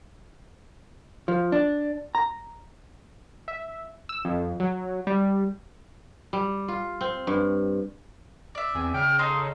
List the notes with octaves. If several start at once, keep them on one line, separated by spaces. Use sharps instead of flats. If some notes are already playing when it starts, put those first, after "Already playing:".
F3
D4
A#5
E5
E6
F2
F#3
G3
G3
F4
C4
G2
D5 E5
E2 C4 G#5
C#3 G5 F6
D#4 A4 C6 D#6